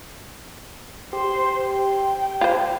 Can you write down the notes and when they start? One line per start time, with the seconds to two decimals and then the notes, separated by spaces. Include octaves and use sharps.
1.13 G4 C5
1.65 G5
2.41 F4 C5